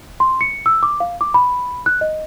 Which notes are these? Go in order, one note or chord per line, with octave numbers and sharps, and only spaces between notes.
C6
C#7
E6
D6
F5
D6
B5
F#6
D#5